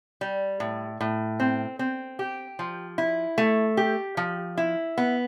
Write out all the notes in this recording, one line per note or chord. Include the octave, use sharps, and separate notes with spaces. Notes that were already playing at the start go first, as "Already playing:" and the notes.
G3
A2
A2
C4
C4
G4
F3
E4
A3
G4
F3
E4
B3